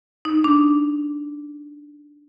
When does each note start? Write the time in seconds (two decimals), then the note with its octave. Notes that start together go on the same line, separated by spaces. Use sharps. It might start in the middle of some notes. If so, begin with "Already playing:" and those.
0.25 D#4
0.44 D4